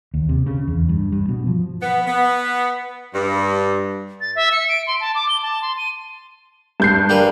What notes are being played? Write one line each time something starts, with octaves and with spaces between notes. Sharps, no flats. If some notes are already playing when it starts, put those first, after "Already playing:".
D#2
C3
C#3
E2
G2
G2
B2
F3
B3
B3
G2
A6
E5
C#7
D7
C6
A5
D6
G7
A5
C6
D#7
G2 G6 C7
G3 A#3 B4